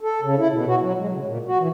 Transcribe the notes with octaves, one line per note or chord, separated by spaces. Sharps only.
A4
C#3
E4
B2
F#4
F#3
G#3
C#3
A#2
F#4
E3